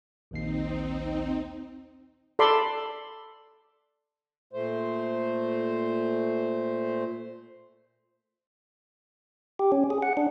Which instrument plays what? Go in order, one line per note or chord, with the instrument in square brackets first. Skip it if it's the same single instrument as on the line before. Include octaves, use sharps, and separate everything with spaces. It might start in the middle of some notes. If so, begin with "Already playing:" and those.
[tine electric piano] A#1 D#2 C7 [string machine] C4 D#4
[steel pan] A4 D5 B5 C6 D6
[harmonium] A#2 A3 C5
[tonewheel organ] G4
C#4
G#4
F#5
D4